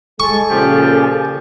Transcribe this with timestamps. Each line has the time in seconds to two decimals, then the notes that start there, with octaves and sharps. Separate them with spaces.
0.20 G#3 A4 G#5 C#6
0.50 A#2 C#3 F3 G4